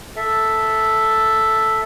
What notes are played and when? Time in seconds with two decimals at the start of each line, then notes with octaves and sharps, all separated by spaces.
0.16 A4 E5